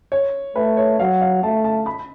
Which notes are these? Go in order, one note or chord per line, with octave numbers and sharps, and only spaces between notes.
C#5
A3 B4
C#5
F#3 F5
F5
A3 A5
A5
B5